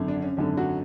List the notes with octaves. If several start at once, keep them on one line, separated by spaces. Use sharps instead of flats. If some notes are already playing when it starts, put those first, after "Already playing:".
Already playing: G#1 F#2 D3
D4
C#4
G#1 F#2 D3
F#3 F#4